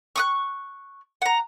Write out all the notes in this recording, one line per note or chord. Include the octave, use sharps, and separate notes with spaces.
C#6 D#6 F#6
F#5 A#5